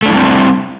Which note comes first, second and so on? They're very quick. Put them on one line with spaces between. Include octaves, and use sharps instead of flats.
A3 D4 E4 G3 C4